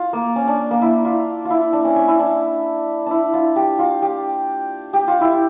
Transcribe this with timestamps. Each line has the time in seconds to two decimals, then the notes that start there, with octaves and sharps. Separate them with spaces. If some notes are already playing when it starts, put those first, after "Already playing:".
Already playing: F4
0.13 A#3
0.36 C#4
0.48 D4
0.71 A#3
0.82 E4
1.05 F4
1.45 F4
1.50 E4
1.73 D4
1.85 C#4
1.96 C#4
2.08 E4
2.19 D4
3.06 D4 E4
3.34 F4
3.56 G4
3.79 F4
4.02 G4
4.93 G4
5.08 F4
5.21 E4